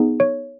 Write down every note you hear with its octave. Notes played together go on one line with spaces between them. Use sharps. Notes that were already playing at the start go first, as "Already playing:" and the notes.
Already playing: B3 D#4 G#4
C#5